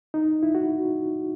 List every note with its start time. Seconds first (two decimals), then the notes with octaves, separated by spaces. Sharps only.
0.14 D#4
0.43 E4
0.55 F#4